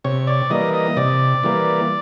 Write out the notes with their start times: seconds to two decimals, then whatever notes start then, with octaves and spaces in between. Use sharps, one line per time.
0.04 C3 C#5
0.27 D5
0.50 E3 G3 A#3 D#5
0.74 D#5
0.97 C3 D5
1.44 E3 G3 A#3